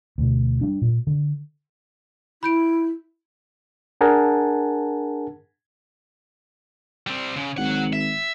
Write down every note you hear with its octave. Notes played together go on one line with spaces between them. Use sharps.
D2 B2
G3 D4
A#2
D3
E4 B5 G6 D7
D4 G#4 A#4 F#5 G#5 A5
G3 C4
C#3
G#1 F#3 F#5
E5